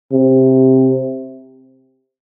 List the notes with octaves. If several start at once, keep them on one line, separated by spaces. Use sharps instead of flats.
C3